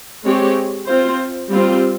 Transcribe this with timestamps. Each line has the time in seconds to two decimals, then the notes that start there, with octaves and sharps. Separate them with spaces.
0.24 G#3 C4 G4 C#5
0.88 C4 F4 C5
1.51 G3 C4 F4